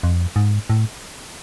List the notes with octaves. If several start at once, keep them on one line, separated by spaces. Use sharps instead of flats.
F2
G#2
A2